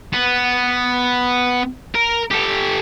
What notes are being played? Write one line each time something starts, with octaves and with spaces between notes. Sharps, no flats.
B3
A#4
G4 A4